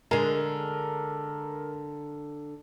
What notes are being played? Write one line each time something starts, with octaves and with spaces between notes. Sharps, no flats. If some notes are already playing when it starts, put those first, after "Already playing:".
D3 G#3 A#4